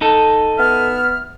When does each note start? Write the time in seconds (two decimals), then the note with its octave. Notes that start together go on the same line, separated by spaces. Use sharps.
0.01 D#4 A4
0.58 B3 E5 F6